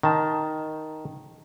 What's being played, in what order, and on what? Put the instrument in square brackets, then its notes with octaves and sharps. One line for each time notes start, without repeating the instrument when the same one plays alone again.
[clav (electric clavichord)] D#3 A5